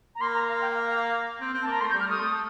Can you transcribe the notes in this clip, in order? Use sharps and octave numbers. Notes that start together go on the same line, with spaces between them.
A#5
A#3 C6
A#5
F5
G5
F5
F5
C4
C4
A5
A#3 A#5
A3 C6
G6
G3
F6
A3 D#6
A3